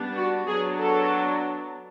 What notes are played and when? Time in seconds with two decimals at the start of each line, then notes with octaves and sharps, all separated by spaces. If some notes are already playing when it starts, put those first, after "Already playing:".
Already playing: G3 B3 D4
0.16 F#4
0.47 F#3 B3 D4 G#4
0.80 A4